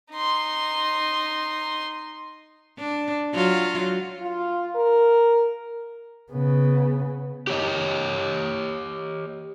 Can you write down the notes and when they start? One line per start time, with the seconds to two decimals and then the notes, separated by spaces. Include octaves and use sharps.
0.12 D#4 C6
2.78 D4
3.34 F#3 F4
4.22 F4
4.75 A#4
6.33 C#3 B3
7.47 G4 C#5 D#5